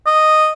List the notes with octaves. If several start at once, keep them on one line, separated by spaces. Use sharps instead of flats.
D#5